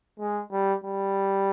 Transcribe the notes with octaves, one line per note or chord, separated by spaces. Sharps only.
G#3
G3
G3